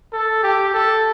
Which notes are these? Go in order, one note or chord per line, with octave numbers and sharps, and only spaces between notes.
A4
G4
A4